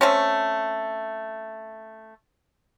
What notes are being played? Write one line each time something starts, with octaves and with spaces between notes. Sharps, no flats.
A3 C4 C#4